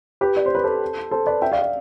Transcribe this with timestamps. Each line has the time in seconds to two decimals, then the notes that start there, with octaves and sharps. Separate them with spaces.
0.21 G4 B4
0.37 D5
0.46 C5
0.55 B4
0.64 A4 C5
1.11 A4 C5
1.27 B4 D5
1.42 E5 G5
1.52 D5 F5
1.62 D5 F5